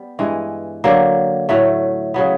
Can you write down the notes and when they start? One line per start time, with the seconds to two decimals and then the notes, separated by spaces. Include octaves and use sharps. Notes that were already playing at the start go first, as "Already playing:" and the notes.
Already playing: G3 B3
0.19 G2 E3 G#3
0.84 D3 F#3 A#3
1.49 A2 F#3 A3
2.14 C#3 F#3 B3